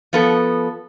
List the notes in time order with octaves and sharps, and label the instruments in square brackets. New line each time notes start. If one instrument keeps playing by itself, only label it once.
[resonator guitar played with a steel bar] F3 B3 A4